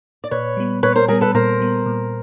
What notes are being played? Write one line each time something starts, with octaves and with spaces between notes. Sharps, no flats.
D5
A#2 B4 C#5
G3 B3
A#2 B4 C#5
A#4 C5
G3 B3 G#4 A#4
A4 B4
A#2 A#4 C5
G3 B3
A#2